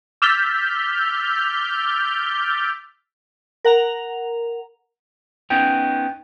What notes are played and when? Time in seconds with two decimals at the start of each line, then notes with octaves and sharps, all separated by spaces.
0.22 D6 E6 F6 G6 A6 B6
3.65 A#4 F#5 A#5 F7
5.50 B3 C#4 D#4 G5